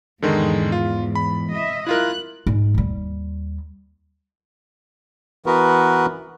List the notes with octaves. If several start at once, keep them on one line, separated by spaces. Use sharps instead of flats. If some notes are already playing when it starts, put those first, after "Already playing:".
E2 G#2 D3 D#3 G#3
F4
B5
D#5 E5
E4 F4 A#4 F#6
G#2
D#2 G3
E3 B3 F#4 A#4 B4